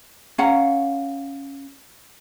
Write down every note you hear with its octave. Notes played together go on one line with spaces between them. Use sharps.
C#4 F5 F#5 A#5